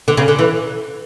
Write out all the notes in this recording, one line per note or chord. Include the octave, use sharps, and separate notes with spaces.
D3
C#3
D3
E3